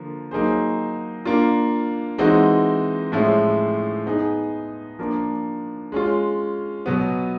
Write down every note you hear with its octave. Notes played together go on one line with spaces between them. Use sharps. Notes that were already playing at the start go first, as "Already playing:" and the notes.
Already playing: D3 F3 A#3
F#3 A#3 D#4 G#4 C5
A#3 D4 F4
E3 G#3 C4 D#4 F#4
A2 F3 G#3 C#4 E4
B3 D#4 G#4
F3 A#3 D4
G#3 C#4 F4
B2 F#3 B3